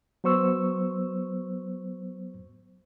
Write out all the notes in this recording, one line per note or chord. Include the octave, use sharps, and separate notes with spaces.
F#3 B3 C5 C#6 E6